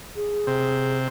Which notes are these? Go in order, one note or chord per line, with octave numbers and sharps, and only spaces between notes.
G#4
C3